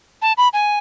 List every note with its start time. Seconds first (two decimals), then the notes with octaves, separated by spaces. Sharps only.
0.22 A5
0.38 B5
0.53 G#5